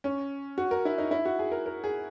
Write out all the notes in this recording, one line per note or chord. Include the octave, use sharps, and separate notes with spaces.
C#4
F#4
A#4
E4
D#4
E4
F#4
G#4
A#4
A#4
G#4